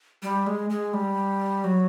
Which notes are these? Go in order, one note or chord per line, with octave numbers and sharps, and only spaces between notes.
G3
G#3
G#3
G3
F#3